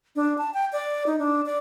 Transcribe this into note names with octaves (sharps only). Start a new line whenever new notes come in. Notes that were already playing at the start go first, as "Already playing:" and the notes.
D4
A5
G5
D5
D#4
D4
D5